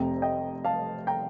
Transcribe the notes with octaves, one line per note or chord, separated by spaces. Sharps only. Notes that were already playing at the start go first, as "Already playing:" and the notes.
Already playing: F1 F2 C3 G5 A#5
D#5 G5
F5 A5
G5 A#5